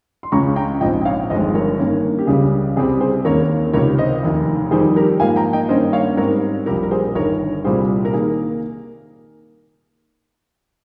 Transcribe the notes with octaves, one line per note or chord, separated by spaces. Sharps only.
C6
C#2 C#3 G#3 C#4 A#5 C#6
G5 A#5
A#1 G#2 F3 C4 D#5 G5
G5
C#5 F5
G1 F2 D#3 G#3 C5 D#5
A#4 C#5
G2 D#3 A#3 C#4
G4
C#2 C#3 G3 G#4
C2 C3 G3 C4 G#4
G#4 C5
D#2 D#3 A#3 C#4 A#4 C#5
C#2 C3 D#3 A#4 C#5
C5 D#5
F1 D#2 D#3
F2 D#3 G3 G#4 C5
G4 A#4
G#2 F3 A#3 F5 G#5
G5 A#5
D#5 G5
G2 D#3 A#3 C#4 C5 D#5
C#5 F5
G#2 G3 C4 A#4 C#5
A#1 A#2 G3 G4 A#4
A#4
G#4 C5
G1 G2 D#3 A#4 C#5
C2 A#2 G3 C4 G#4 C5
A#4
D#3 A#3 G#4